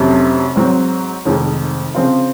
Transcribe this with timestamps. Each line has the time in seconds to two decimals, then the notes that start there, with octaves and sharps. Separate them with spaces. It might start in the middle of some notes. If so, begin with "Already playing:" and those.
Already playing: F1 F2 C3 F#3 C#4
0.56 G#2 F#3 C4
1.25 F1 F2 D#3 G#3
1.95 C#3 F3 C4 F4